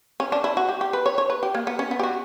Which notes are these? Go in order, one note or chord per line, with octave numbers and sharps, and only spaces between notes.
C#4
D4
E4
F#4
G4
G4
B4
C#5
C#5
B4
G4
A#3
B3
C#4
B3
G4
F#4